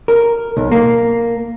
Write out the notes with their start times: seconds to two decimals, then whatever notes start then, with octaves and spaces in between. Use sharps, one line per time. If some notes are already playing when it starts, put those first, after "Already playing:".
0.08 A#4
0.57 B1
0.72 A#3